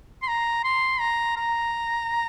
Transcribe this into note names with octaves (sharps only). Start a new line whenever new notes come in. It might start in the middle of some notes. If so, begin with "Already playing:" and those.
C6
A#5
C6
A#5
A#5